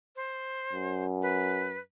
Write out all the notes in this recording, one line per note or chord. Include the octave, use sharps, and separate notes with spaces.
C5
F#2
B4